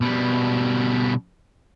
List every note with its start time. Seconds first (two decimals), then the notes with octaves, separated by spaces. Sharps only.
0.01 B2 G3